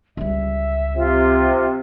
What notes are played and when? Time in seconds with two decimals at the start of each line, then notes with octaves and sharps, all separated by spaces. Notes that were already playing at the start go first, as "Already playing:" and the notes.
0.17 C#2 G3 E5
0.96 C3 F4